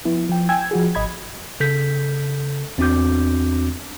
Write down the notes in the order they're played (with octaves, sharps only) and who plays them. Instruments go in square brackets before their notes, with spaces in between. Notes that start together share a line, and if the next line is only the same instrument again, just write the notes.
[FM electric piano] F3 B3 E4
F3 G5
G5 G#5 E6 G#6
F3 F#4 G#4
G#1 D#5 B5 G#6
[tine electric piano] C#3 A4 G6 B6
E2 C4 D4 F#4 D6 G6